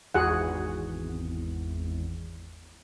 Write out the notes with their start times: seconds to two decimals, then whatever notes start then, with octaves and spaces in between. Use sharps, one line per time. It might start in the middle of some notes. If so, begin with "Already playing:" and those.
0.14 G#1 E2 F#4 G#4 F#5